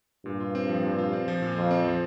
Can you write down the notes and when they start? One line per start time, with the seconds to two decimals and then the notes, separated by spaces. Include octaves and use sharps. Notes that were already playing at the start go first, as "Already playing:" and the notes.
0.25 G2 A#2
0.40 F4
0.55 C4
0.69 F3
0.83 A#2
0.99 F4
1.13 C4
1.28 F3
1.42 A#2
1.56 F2 F4
1.71 C4
1.85 F3